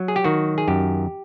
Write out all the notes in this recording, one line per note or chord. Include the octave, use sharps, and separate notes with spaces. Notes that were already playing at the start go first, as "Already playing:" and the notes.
Already playing: F#3
G#4
G4
D#3 F#4
G#4
F#2 G4